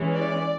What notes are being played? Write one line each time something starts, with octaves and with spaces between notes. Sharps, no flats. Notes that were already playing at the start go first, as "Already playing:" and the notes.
Already playing: E3 G#3 C#4
D5